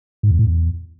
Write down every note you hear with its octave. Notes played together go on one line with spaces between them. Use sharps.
G#2
E2
A2
E2